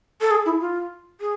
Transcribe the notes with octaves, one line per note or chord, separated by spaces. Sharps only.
A4
G#4
E4
F4
G#4